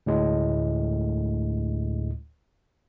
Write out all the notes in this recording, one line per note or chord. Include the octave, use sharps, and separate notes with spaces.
D2 A2 G#3